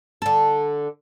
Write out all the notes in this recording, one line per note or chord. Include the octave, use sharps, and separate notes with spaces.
D3 A4